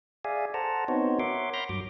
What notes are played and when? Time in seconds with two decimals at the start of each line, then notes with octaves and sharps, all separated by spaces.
0.25 G#4 D5 E5 F5 G#5
0.54 A4 C5 F#5 A5 A#5
0.88 B3 C4 D#4 F#4 C5 C#5
1.19 A#4 C#5 E5 F#5 C6 D6
1.54 B5 C6 F6 G6 A#6
1.69 G2 F#3 D6